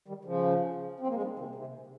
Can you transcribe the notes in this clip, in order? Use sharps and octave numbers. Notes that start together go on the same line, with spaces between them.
D#3 G3
C#3 F3
C4
A#3
G#3
D#3 G3
C3 D#3
C3